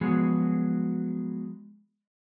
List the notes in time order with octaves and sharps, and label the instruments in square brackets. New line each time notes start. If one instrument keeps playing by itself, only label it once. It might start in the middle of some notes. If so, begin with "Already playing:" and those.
[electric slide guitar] F3 F#3 G#3 B3 F#4 G#4